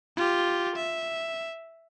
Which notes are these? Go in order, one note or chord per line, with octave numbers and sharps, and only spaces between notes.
F4 G4
E5